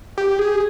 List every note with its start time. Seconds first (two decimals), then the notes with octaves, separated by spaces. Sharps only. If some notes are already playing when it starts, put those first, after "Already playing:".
0.18 G4
0.39 G#4